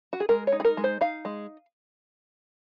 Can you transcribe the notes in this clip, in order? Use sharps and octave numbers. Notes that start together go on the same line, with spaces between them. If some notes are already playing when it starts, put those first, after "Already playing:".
F#4
G#4
G#3 A#4
C#5
D#4
G#4
A#4
G#3
C5
D#4 F5
G#3